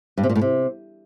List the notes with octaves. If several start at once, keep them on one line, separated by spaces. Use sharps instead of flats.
G2
C3
A#2
A2
C3